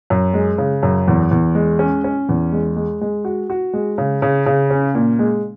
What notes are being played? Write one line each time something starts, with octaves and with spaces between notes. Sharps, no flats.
F#2
G#3
C#3
F#2
E2
E2
G#3
C#4
C#4
E2
G#3
G#3
G#3
F#4
F#4
G#3
C#3
C#3
C#3
C#4
A#2
G#3